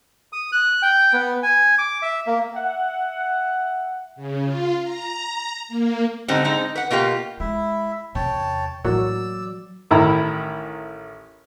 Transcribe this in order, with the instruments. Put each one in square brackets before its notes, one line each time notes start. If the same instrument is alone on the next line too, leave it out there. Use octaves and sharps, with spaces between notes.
[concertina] D#6
F#6
G5
B3
G#5
D6
E5
A#3
[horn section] E5 F#5
[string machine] C#3
F4
A#5
A#3
[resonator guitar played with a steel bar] G#2 D3 G3 C4 D#4
G#3 C4 D#4
B4 F#5
B2 A#3 F4 G4
[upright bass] G#3 [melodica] E4 E5
[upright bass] E2 C3 [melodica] C#5 G5 A5
[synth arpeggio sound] A2 F#4 A#4 [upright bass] E3 A#3 [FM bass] F#3 [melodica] D5 E6
[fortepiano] A1 D#3 E4 A#5 B5